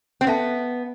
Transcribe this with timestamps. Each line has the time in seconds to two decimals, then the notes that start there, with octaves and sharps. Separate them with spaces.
0.21 C4
0.27 B3 A4 E5 A5